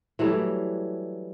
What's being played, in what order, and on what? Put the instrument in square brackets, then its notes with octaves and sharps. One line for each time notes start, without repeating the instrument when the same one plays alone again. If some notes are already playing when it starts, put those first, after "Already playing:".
[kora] E3 F#3 G3 A3